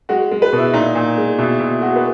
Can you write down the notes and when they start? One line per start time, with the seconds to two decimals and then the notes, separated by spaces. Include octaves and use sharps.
0.09 G#3 F#4
0.31 G#3
0.42 B4
0.53 B2
0.58 E4
0.73 A#2 D#4
0.95 A#2
1.18 G#3
1.38 B2 E4
1.60 B2 E4
1.81 G#3 F#4
1.96 B4